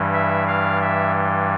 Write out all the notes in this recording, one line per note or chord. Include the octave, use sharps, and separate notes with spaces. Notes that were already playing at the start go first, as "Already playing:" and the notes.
Already playing: G2 E3 G3
E5
F5
E5